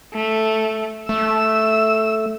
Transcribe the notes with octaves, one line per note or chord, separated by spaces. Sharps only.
A3
A3 E6